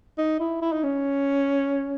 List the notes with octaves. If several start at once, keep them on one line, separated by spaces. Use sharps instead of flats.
D#4
E4
E4
D#4
C#4